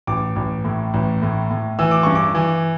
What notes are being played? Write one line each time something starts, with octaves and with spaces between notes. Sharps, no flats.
A1 D6
A1
A2
A1
A2
A2
E3 E6
D6
G2 C#6
D6
E3